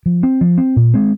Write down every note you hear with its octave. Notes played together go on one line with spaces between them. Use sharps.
F3
C4
F3
C4
A#2
G#3 C4